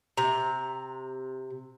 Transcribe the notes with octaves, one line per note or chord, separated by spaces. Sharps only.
C3 A#5